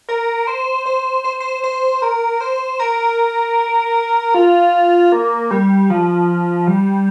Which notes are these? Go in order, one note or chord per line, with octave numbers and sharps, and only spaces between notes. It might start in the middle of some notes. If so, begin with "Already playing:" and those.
A#4
C5
C5
C5
C5
C5
A#4
C5
A#4
F4
A#3
G3
F3
G3